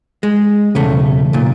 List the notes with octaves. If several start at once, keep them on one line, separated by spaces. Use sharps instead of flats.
G#3
B1 E2 C#3 A3
B1 A#2